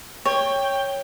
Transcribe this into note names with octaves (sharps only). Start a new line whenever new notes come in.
C#5 G5